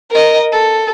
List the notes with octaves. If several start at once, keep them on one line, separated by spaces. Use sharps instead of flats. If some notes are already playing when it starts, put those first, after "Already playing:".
A#4 D#5
A4